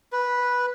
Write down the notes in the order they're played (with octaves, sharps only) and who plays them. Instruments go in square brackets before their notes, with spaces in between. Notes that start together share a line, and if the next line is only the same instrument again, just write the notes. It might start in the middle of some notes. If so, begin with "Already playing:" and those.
[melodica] B4